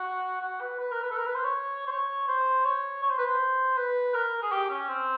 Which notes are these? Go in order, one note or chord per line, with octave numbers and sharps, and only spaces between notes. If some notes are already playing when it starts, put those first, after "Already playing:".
Already playing: F#4
F#4
B4
B4
A#4
B4
A4
A#4
B4
C5
C#5
C5
C#5
C5
C#5
C#5
C5
B4
C5
B4
A#4
G#4
G4
C#4
C4